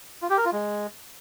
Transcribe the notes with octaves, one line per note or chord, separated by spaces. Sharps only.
F4
G4
A#4
F4
G#3